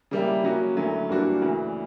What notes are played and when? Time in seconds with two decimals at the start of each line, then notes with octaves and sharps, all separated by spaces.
0.11 C#3 G3 A#3 E4
0.44 C#3 F#3 A#3 C#4 F#4
0.76 D2 D3 F#3 C#4 E4
1.09 G2 E3 A#3 D4 F#4
1.42 D2 C#3 E3